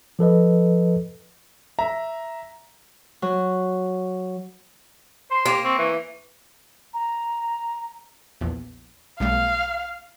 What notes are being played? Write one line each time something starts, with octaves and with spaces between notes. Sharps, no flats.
F3 A4 B4 D#5
E5 A#5
F#3
C5 C6
A#3 G4
C4 C#6
E3
A#5
A#1 E2
B1 G3 A3 F5